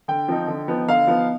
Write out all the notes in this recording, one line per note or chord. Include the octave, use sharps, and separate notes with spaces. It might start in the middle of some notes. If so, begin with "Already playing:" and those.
D3 G5
F3 C4 D#4
D3
F3 B3 D#4
D3 F5
F3 B3 D#4